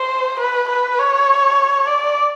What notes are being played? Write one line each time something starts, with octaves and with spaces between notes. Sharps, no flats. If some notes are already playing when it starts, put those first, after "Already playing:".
Already playing: C5
B4
B4
C#5
D5